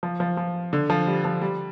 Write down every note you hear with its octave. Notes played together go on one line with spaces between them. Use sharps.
F3
F3
F3
D3
F3
G3
F3
G3